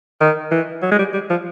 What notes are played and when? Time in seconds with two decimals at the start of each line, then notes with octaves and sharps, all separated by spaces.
0.21 D#3
0.52 E3
0.82 F#3
0.91 G#3
0.99 G3
1.14 G3
1.30 F3